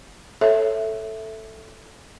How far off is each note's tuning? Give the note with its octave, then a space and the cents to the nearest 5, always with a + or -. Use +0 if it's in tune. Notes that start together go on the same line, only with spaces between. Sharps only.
A4 +5 C#5 +0 E5 +0